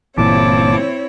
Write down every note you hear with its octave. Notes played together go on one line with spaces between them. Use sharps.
G1 A#2 E3 C4 E4 C#5 A5 D6